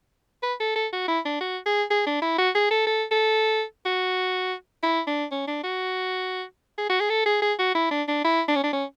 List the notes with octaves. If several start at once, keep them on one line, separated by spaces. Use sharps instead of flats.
B4
A4
A4
F#4
E4
D4
F#4
G#4
G#4
D4
E4
F#4
G#4
A4
A4
A4
F#4
E4
D4
C#4
D4
F#4
G#4
F#4
G#4
A4
G#4
G#4
F#4
E4
D4
D4
E4
D4
C#4
D4
C#4